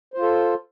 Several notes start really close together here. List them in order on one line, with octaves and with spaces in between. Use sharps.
C5 F4 A4